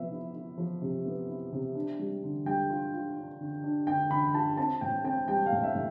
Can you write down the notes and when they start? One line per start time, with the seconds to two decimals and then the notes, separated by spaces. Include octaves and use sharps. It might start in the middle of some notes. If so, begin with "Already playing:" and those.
Already playing: C3 F3 B3 E5
0.11 E4
0.35 E4
0.58 F3
0.82 C3
1.05 B3
1.29 E4
1.52 C3
1.75 D4
1.99 G3
2.23 D3
2.46 G3 G5
2.70 F4
2.93 F4
3.17 D4
3.40 D3
3.64 D4
3.87 D3 G5
4.10 D3 B5
4.34 F4 A5
4.57 C4 A5
4.81 A2 G5
5.04 C4 G5
5.28 G3 G5
5.46 F5
5.52 A2
5.63 E5
5.75 A2